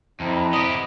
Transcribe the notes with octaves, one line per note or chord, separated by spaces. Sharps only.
F2 C4 E4 A#5
B3 G4 D#5